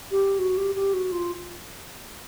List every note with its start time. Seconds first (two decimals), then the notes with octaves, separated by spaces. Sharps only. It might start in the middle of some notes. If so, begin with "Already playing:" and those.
0.12 G4
0.39 F#4
0.57 G4
0.76 G4
0.94 F#4
1.12 F4